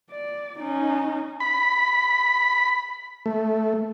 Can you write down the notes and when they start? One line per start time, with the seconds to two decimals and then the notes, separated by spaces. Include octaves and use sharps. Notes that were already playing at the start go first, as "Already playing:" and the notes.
0.11 D5
0.60 C#4 D#4
1.40 B5
3.26 A3